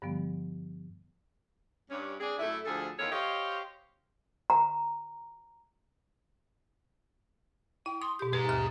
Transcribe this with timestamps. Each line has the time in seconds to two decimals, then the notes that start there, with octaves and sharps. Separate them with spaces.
0.02 G2 D3 F3 G3 B3
1.90 G2 C#4
2.20 C4 D4 G#4
2.39 F#2 A3 E4
2.65 D2 F3 G#4 A4
2.99 E2 D#3 F4 A4 C#5
3.12 G4 C5 C#5 D#5 F5
4.50 A#5
7.86 E4 G5
8.02 C6 D#6
8.19 B2 G4 G6
8.33 G#4 B4 A#5
8.49 D#2 B2 F6